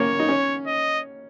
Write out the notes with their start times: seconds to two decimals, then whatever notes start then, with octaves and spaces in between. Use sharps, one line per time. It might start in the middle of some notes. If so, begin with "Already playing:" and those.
Already playing: A#3 C#4 C#5
0.20 D#4
0.29 C#4
0.67 D#5